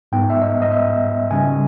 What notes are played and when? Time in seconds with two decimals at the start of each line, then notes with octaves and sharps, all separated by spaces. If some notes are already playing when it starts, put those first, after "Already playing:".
0.12 G#2 G3 B3 D#4 G5
0.30 E5
0.42 D#5
0.62 D#5
0.72 E5
1.31 C#3 G3 C#4 G#5